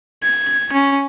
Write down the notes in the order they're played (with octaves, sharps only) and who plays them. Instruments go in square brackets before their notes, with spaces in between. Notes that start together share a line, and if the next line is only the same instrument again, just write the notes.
[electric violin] G#6
C#4